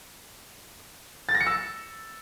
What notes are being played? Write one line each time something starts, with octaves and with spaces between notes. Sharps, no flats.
A6
A#6
C#7
E6